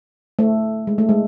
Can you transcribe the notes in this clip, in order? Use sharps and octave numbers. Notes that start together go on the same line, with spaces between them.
A3
G#3
A3
G#3